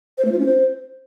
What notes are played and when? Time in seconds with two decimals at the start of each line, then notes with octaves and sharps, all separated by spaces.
0.18 C5
0.25 A3
0.32 F4
0.39 C#4
0.46 C5